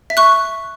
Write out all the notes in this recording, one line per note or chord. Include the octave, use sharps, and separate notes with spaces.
E5
C#6 F#6